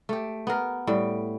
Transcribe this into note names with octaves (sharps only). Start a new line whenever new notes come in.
A3 G4
B3 A#4
A2 G3